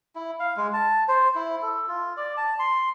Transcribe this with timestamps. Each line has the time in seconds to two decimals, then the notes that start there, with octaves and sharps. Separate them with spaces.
0.16 E4
0.40 F5
0.57 G#3
0.73 A5
1.08 C5
1.35 E4
1.62 A4
1.88 F4
2.17 D5
2.37 A5
2.59 C6